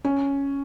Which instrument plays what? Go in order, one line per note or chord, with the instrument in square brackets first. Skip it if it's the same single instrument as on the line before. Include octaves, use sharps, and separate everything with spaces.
[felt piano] C#4